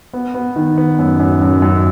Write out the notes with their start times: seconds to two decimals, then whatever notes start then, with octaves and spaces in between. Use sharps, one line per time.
0.13 B3
0.34 B3
0.56 D#3
0.78 B3
0.99 F#2
1.20 F#2
1.42 F#2
1.62 F#2